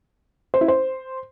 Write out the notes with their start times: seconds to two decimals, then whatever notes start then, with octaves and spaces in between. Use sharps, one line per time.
0.54 C5
0.61 E4
0.68 C5